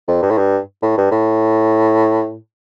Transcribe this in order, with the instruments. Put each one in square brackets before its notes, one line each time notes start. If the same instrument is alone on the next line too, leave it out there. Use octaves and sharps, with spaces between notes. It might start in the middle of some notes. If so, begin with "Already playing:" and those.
[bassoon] F2
G2
A2
G2
A2
G2
A2